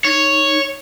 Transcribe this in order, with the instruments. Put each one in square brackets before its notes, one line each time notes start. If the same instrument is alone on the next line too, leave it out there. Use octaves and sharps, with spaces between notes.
[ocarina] D#4 [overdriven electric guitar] C#5